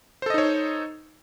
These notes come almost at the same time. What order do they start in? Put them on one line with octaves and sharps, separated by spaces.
C5 A4 D#5 D#4 C#5